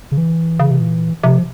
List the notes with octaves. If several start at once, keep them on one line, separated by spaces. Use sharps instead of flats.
C#3
E3
C#3
C3
A#2
C3 F3